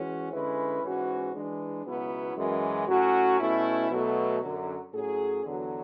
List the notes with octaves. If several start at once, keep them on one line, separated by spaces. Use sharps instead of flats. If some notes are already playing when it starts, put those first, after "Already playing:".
Already playing: E3 G#3 C#4 F#4
D3 G#3 C#4 E4 B4
G#2 E3 G#3 C#4 F#4
E3 G#3 D4
C#2 B2 F#3 B3 E4
F#2 E3 G#3
A2 F#3 C#4 F#4
B2 A3 C#4 E4
B2 F#3 A3
F#2 D3 F#3
A2 F#3 C#4 G#4
E2 D3 F#3